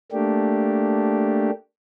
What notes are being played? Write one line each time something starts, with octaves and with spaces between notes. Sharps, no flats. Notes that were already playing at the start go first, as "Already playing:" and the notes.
A3 A#3 D4 G4